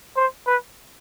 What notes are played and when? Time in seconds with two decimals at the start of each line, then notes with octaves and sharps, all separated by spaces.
0.17 C5
0.47 B4